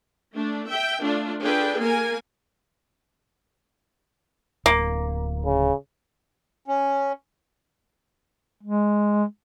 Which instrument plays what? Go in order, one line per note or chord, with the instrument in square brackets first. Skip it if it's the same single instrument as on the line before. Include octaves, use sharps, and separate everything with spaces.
[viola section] A3 D4
E5 G5
A3 D4 F4
D4 F4 G#4 A4 B4 G5
A#3 A#4 G#5
[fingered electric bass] D1 [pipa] A#3
[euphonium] C#3
[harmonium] C#4
[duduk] G#3